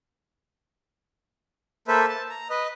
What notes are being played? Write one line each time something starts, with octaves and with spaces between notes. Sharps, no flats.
A#3 A4 B4 C5 E5
A5
A#5
B4 D#5